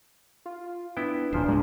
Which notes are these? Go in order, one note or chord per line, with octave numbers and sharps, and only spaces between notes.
F4
F4
B3 D4 E4 G5
D1 A#2 F3 D4 C5
D2 A#2 G#3